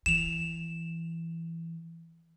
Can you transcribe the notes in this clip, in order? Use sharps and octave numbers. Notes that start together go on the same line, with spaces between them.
E3 E7 F7